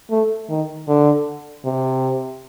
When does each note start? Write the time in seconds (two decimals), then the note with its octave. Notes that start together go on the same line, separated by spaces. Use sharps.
0.11 A3
0.49 D#3
0.88 D3
1.65 C3